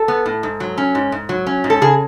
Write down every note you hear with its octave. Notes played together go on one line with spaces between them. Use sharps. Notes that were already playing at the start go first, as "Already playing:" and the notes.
Already playing: A4
B3
A2
G#2
F#3
C#4
G#2
G#2
F#3
C#4
G#2
A4
C#3 G#4